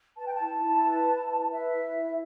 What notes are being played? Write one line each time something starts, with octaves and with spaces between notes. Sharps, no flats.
B4 A5
G5
A5
E4
E4
B4
E4
B4
B4 E5
E4
E4